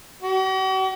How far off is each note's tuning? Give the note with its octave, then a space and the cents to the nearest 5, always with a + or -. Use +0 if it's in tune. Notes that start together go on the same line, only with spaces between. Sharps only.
F#4 +45